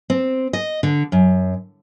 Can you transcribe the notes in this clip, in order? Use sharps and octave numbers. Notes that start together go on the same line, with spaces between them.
C4
D#5
D3
F#2